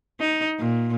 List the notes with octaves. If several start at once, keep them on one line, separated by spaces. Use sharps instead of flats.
D#4
A#2